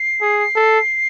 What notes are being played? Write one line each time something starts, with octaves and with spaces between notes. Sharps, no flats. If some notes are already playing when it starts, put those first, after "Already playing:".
Already playing: C7
G#4
A4